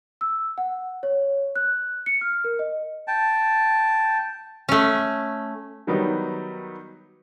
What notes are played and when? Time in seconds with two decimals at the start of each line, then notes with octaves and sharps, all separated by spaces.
0.21 E6
0.58 F#5
1.03 C#5
1.56 F#6
2.06 C#7
2.21 F6
2.44 A#4
2.59 D#5
3.08 G5 A5
4.69 A3 C#4
5.87 D#3 F#3 G3 B3 D#4